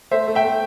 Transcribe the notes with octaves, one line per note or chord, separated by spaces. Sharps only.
A3 C5 E5
A3
E5 G5
A3